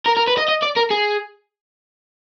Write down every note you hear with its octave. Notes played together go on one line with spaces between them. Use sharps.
A#4
A#4
B4
D#5
D#5
D5
A#4
G#4